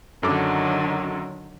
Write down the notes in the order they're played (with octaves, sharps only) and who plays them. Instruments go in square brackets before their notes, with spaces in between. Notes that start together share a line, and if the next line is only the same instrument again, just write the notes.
[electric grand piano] F#2 A4 D6 [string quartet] D3 D#3 F#3